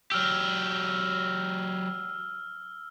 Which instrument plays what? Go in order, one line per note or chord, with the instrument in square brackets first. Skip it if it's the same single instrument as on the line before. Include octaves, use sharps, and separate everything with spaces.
[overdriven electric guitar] F#3 G4 [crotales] E6 F6